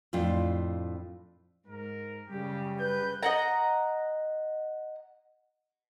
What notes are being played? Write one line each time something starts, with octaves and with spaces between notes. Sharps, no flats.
F2 A2 D4 F4 G5
G#2 A#4
F#2 C#3 G3 G4
B4 G6
D#5 F#5 A#5